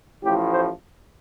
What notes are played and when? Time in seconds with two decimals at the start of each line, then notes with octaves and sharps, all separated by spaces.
0.23 A1 A2 F3 G4
0.52 C5